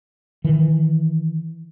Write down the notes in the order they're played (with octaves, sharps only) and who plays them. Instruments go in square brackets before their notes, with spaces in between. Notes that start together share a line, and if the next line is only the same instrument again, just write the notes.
[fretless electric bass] D#3 E3